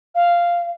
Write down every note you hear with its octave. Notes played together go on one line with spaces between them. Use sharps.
F5